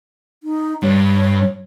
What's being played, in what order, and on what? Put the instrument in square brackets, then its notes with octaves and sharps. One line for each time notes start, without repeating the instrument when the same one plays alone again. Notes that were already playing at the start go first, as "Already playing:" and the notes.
[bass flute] D#4
[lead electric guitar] G2 [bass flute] C#5